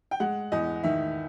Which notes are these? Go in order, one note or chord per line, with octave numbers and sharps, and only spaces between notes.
G5
G#3 F#5
E2 D#5
D#3 E5